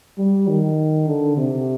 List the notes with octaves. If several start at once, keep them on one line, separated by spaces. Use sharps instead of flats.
G3
D#3
D3
C3